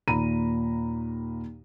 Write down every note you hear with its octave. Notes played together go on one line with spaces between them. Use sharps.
D#2 A#2 A#5 B5 D#7